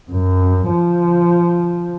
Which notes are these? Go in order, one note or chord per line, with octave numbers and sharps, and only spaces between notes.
F#2
F3